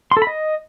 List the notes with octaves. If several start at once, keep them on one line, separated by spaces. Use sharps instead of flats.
C6
A4
B5
D#5